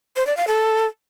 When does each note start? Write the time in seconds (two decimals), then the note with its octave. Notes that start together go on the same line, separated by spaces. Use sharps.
0.16 C5
0.27 D5
0.37 F5
0.48 A4